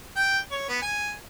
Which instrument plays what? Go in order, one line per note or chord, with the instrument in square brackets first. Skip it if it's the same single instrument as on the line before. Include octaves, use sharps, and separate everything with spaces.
[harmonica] G5
C#5
B3
G#5